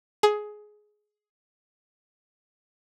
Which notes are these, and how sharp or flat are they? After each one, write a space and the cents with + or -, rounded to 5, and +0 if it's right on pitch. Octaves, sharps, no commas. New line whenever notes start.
G#4 +15